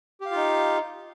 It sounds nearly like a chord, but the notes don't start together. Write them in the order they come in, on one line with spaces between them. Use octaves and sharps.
G4 F5 F4 D#4